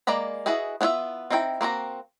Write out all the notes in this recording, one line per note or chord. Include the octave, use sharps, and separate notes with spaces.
G#3 A#3 D5 A#5 B5
E4 F#4 G#4 B4 D#5
B3 D4 E4 F4 E5
C4 D#4 E4 E5 G5
A#3 C4 F#4 A#5